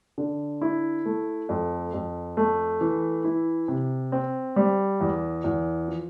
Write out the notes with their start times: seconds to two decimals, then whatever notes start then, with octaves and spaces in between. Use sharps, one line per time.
0.18 D3
0.61 E4
1.05 A3
1.49 F2
1.94 F2
2.37 A3
2.81 E3
3.24 E4
3.68 C3
4.12 C4
4.56 G3
5.01 E2
5.44 E2
5.88 F3